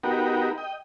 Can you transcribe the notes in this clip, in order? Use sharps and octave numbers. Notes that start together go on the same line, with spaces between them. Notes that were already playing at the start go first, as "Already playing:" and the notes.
B3 D#4 F#4 G4 A#4
D#5 G5